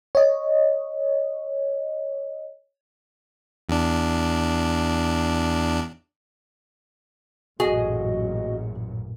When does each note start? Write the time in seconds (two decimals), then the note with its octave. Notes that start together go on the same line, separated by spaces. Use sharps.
0.15 C#5 D#5
3.69 E2 D4
7.60 A1 F#2 A#2 F#4 G#4 D#5